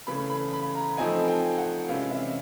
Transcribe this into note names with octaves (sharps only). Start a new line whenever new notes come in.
C#3 E3 A3 C#4 B5
B5
B5
A#5
F3 A3 C4 D#4 G#5
G5
F#5
C3 E3 G#3 C#4 F5
E5